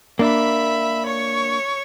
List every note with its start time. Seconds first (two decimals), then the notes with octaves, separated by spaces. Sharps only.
0.19 A#3 D4 E5 B5
1.05 C#5 C#6